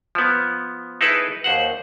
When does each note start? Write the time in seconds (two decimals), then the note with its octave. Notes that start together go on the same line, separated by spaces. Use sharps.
0.15 F3 B3
1.01 D#4 E4 G#4 A4 B4
1.44 D#2 C5 F#5